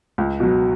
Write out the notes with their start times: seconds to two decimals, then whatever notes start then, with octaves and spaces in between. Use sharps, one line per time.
0.18 C#2
0.40 B2 F#3